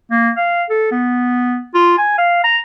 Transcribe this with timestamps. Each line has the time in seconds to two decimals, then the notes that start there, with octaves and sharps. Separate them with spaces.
0.11 A#3
0.37 F5
0.69 A4
0.92 B3
1.74 F4
1.98 G#5
2.18 F5
2.44 A#5